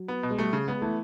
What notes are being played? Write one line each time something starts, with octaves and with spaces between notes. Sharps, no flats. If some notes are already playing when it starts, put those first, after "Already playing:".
Already playing: F#3
B3
B2
G#3
G3 A3
C#3
G#3 B3
E3 A3